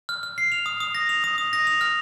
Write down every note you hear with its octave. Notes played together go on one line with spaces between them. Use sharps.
F6
F6
C7
F7
D#6
D#6
A#6
F7
D#6
D#6
A#6
F7
F6